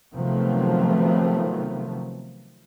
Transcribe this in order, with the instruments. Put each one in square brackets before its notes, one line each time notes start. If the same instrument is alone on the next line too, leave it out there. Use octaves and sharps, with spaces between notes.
[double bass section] C3 D#3 F3 F#3 A3 B3